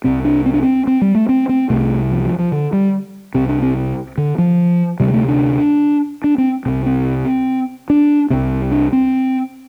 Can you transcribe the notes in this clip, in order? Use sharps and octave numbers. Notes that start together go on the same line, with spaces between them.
C2 C3 C4
D4
C4
D4
C4
C4
G3
A3
C4
C4
C2 C3 A3
F3
F3
F3
D3
G3
C2 C3 C4
D4
C4
D3
F3
D2 C3 G3
A3
D4
D4
C4
C2 C3 C4
C4
D4
C2 C3 C4
D4
C4